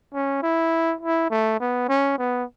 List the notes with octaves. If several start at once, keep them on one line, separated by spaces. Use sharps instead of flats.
C#4
E4
E4
A3
B3
C#4
B3